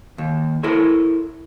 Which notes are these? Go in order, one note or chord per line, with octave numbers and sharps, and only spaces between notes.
D#2
E4 A4 A#4 C5 C#5